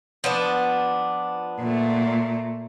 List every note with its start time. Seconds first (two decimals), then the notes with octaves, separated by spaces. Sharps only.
0.24 F3 B3 D4
1.59 A#2 A3